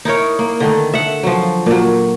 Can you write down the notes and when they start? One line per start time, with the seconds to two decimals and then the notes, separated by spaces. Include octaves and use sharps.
0.05 D#4 E4 A#4 C#5
0.39 A#3
0.60 D3 D#3 A3
0.94 E5 F#5
1.23 F3 F#3
1.66 A#2 F#3